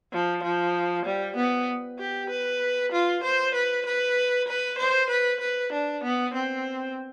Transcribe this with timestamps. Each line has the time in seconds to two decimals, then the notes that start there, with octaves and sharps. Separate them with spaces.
0.13 F3
0.43 F3
1.06 G3
1.37 B3
1.99 G4
2.30 B4
2.92 F4
3.24 C5
3.54 B4
3.86 B4
4.48 B4
4.78 C5
5.10 B4
5.41 B4
5.73 D4
6.04 B3
6.34 C4